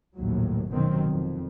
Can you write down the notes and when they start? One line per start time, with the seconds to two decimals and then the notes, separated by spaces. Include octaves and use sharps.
0.15 A#1 D#2 A2 F#3
0.70 F1 F#2 B2 D#3 F#3 C4
1.07 F2